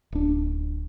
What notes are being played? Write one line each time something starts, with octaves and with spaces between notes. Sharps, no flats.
D1 D4